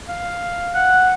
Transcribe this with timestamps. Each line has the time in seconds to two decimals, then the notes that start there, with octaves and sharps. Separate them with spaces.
0.09 F5
0.74 F#5